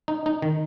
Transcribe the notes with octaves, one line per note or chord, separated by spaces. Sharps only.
D#4
D#4
D#3